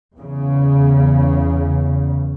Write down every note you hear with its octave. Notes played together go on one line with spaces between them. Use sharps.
E2 C#3